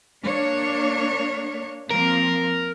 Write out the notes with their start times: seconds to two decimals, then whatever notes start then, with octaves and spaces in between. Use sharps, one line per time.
0.24 A#3 D4 C#5
1.91 F3 A#3 C4 A#4